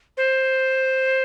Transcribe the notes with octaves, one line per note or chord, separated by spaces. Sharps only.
C5